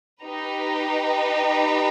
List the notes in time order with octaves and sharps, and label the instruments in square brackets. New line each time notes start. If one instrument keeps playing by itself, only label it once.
[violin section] D#4 G4 B4